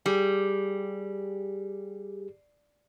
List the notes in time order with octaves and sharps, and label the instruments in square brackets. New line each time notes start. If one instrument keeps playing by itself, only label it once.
[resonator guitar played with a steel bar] G3 [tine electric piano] G4 G#4